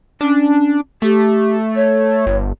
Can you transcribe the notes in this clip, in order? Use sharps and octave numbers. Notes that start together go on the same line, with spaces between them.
C#4 D4
A3 G4
C#5
G1